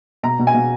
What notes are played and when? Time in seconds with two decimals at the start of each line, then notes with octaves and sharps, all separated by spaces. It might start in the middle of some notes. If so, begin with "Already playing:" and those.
0.23 B2 A#5
0.39 B2
0.47 G#5
0.54 B2